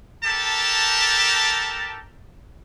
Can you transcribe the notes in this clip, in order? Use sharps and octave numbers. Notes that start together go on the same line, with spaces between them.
G4 A4 A#4 A5